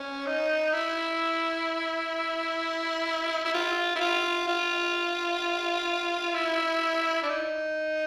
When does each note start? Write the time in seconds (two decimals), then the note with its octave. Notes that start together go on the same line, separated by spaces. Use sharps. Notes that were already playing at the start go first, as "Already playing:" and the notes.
Already playing: C#4
0.26 D#4
0.73 E4
3.45 E4
3.54 F4
3.96 E4
4.01 F4
4.48 F4
6.34 E4
7.23 D4
7.29 D#4